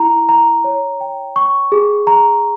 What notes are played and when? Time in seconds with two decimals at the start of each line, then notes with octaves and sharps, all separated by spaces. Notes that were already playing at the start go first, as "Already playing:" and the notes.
Already playing: E4 A#5
0.29 A#5
0.64 C#5
1.01 G5
1.36 C#6
1.72 G#4
2.07 A#5